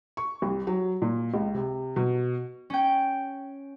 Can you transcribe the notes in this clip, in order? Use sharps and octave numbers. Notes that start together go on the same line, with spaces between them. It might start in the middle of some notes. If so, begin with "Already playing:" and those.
C#6
C2
F#3
A#2
C#2
C3
B2
C#4 G5